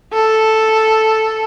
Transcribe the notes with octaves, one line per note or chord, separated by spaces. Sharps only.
A4